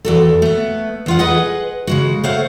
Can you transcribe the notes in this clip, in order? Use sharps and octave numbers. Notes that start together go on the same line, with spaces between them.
E2 F#4 A4
A3 B3
E2 F4 F#5
G#4 B4 D#5 F#5
C#3 G#3 F#4
A3 C5 C#5 F5 F#5